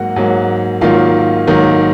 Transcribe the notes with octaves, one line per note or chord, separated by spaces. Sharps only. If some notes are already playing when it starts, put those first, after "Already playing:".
Already playing: G#2 F#3 A#3 F#4 F#5
G#2 F#3 A#3
G#2 D#3 F#3 A#3 F4 F5
G#2 D#3 F#3 A#3